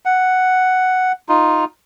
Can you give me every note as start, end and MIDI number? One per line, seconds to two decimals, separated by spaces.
0.05 1.12 78
1.29 1.65 63
1.29 1.65 65